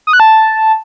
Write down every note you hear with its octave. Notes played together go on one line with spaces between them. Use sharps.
D#6
F#6
A5